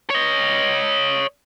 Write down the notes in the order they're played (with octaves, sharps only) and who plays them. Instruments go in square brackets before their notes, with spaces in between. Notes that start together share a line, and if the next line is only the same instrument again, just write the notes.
[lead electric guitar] C#5 D#5